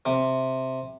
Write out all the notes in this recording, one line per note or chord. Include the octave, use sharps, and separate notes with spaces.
C3